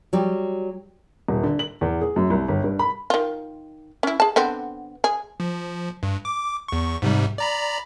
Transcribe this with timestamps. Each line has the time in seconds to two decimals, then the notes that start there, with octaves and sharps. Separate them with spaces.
0.13 F#3 G3
1.28 D#1
1.43 D3
1.59 F#7
1.81 E2
2.01 G#4
2.16 F#2
2.30 C2
2.48 G1
2.64 G2
2.79 B5
3.10 D#3 F4
4.03 C#4 E4
4.20 G#4 A5
4.36 D3 B3 C4
5.04 G#4
5.40 F3
6.03 G2
6.25 D6
6.68 E2 C#6
7.02 G#2 C3 G3
7.38 D5 A#5 B5